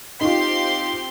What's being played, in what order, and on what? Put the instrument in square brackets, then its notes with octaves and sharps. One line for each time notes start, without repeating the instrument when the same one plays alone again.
[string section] C4 G4 C6 [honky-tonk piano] D#4 F4